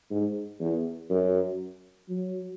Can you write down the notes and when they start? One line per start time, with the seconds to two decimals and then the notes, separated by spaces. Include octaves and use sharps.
0.10 G#2
0.60 E2
1.10 F#2
2.09 F#3